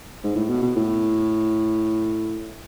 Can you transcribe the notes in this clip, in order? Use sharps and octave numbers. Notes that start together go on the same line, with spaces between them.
G#2
A2
B2
B2
A2